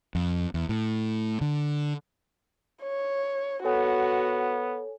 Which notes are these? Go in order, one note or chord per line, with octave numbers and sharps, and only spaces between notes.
F2
E2
A2
D3
C#5
B3 F#4 A4 C#5 G#5